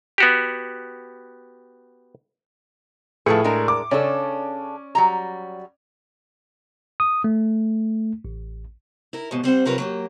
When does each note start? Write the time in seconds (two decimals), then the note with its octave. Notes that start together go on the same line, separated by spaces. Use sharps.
0.18 B3 F#4 G4
3.26 A2 F3 A3 G#4 B4 C#7
3.44 G#3 D4 A#4
3.68 D6
3.91 C#3 C#4 D4 A4 D5
4.95 F#3 G3 A#5
7.00 D#6
7.24 A3
8.25 A1
9.13 E4 A#4
9.31 D#2 G#2 B2
9.44 G3 C4 C5 F#5
9.65 C3 F#3 G3 F4 A#4 B4
9.78 F#3 A#3 G4